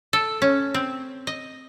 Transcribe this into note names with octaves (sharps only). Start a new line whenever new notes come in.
A4
C#4
C4
D#5